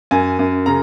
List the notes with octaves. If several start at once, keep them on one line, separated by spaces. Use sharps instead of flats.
F#2 G#5
F#2
C#3 A#5